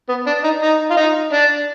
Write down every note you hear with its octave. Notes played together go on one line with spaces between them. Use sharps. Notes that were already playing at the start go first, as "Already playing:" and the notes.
B3
D4
D#4
D#4
F4
D#4
D4